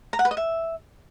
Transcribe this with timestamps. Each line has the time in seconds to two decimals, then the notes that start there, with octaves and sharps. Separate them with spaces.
0.13 A#5
0.19 F#5
0.25 B4
0.31 D#5
0.37 E5